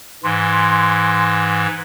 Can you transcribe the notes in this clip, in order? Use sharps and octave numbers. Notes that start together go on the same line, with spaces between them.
G#2 E3 C6